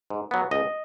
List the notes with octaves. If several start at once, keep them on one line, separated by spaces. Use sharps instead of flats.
G#2
F#3 B3
C#2 D#5